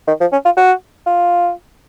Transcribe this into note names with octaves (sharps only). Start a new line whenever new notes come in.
D#3
F3
C#4
F4
F#4
F4